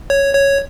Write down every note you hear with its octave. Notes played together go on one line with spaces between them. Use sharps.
C#5
C#5